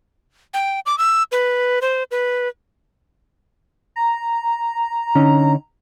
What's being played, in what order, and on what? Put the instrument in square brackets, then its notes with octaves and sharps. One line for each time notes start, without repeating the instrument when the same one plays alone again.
[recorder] G5
D6
E6
B4
C5
B4
[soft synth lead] A#5
[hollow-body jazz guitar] D3 C#4 D#4